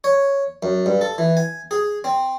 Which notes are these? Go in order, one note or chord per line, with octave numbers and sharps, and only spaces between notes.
C#5
F#2
G2
A4
E3
G#5
G#4
C4